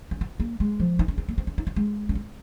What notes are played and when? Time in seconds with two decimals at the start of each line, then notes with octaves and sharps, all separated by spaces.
0.11 C#4
0.21 C4
0.40 A#3
0.60 G#3
0.80 F3
0.99 D#4
1.08 C#4
1.18 C4
1.29 A#3
1.38 C4
1.47 C#4
1.58 D#4
1.67 C#4
1.76 G#3
2.09 C#4
2.15 C4